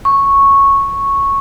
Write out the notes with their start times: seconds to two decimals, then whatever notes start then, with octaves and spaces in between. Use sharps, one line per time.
0.05 C#6